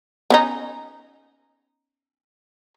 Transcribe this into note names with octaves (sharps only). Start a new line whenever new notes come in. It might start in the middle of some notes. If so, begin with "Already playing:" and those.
B3 C#4 D#4